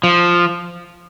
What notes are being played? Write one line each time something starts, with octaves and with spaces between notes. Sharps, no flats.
F3